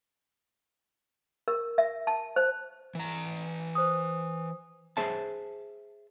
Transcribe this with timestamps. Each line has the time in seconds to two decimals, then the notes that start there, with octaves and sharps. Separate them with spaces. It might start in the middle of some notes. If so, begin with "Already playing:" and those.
1.48 A#4
1.78 E5
2.07 A5
2.36 C5
2.95 E3 A#5
3.75 C5 D#6
4.97 G#4 C5 E5 A5